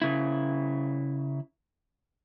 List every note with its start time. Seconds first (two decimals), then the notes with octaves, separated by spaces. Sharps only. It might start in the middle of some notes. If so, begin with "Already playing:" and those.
0.02 C#3 E4